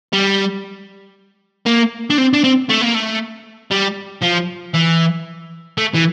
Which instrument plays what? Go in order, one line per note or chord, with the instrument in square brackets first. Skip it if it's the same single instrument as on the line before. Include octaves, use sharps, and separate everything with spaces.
[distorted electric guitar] G3
A#3
D4
C4
D4
C4
A3
A#3
A3
G3
F3
E3
A3
E3